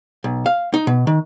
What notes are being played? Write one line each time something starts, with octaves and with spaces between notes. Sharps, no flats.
B1
F5
D#4
B2
D#3